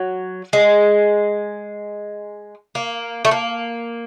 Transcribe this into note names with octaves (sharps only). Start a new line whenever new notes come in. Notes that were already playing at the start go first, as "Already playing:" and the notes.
Already playing: F#3
G#3
A#3
A3
A#3